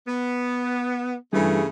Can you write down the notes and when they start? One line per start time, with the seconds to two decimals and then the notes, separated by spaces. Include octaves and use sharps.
0.07 B3
1.33 G2 C#3 E3 G3 A3 G#4